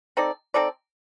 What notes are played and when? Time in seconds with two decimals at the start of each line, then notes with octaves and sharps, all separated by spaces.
0.17 C4 D#4 A4 D5
0.54 C4 D#4 A4 D5